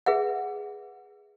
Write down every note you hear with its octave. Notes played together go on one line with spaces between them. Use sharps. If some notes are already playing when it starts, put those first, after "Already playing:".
G#4 B4 E5 F#5